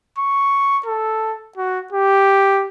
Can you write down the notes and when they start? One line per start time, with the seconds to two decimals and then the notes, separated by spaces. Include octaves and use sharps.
0.18 C#6
0.86 A4
1.57 F#4
1.93 G4